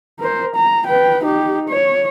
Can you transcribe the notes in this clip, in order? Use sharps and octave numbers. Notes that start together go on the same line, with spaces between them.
A#4 C5
A#5
B4 G5
D#4 G4
C#5